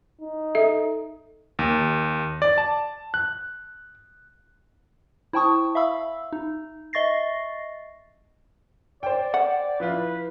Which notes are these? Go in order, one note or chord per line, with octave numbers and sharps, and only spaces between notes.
D#4
A4 E5
D#2
D5
A5
F#6
E4 C5 G5 A5 C#6 D#6
E5 F5 B5 E6
D#4
D#5 E5 C#6 A6 A#6 C7
C5 D5 G5
F#5
F3 E4 F4 B4